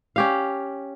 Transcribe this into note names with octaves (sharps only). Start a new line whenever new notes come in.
C#4 G4 F5